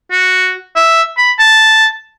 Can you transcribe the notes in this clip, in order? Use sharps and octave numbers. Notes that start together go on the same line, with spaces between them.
F#4
E5
B5
A5